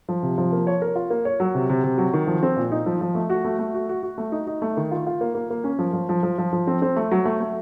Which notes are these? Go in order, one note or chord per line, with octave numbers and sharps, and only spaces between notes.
F3
C3
F3
A#3
C#5
A#4
F4
A#3
C#5
F#3
C3
C3
C3
F#3
D#3
F3
C4
A#2
D#4
F3
F3
A3
F#4
A3
A3
F#4
F#4
F#4
A3
D#4
D#4
A3
D#3
F4
F4
A#3
A#3
A#3
C#4
F3
F3
F3
F3
F3
F3
C4
C4
A3
F#3
A3
A3